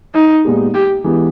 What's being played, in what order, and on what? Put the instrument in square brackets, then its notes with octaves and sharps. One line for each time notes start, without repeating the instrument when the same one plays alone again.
[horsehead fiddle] D#4
[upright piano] A#2 G#3 B3 G4
[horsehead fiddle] G4
[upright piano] E3 G#3 B3 G4